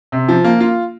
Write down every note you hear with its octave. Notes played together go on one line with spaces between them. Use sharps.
C3
F3
A#3
F4